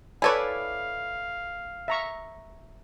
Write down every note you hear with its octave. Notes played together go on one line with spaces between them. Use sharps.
E4 A4 B4 C#5 D5 F5 G#5
E5 A#5 C#6